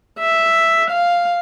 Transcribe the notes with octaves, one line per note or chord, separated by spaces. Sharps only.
E5
F5